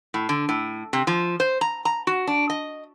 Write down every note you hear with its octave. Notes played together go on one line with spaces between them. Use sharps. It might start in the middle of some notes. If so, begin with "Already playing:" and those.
A2
D3
A2
C3
F3
C5
A#5
A#5
F#4
D4
D#5